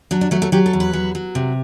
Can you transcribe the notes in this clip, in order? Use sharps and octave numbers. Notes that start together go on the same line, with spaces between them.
F#3 D4
D4
F#3 A3
A3
F#3 G4
A4
E2
B4
F#3
F#3
C3